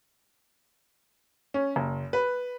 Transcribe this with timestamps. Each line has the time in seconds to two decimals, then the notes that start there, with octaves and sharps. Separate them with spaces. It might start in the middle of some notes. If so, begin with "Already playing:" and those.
1.54 C#4
1.76 F#1
2.13 B4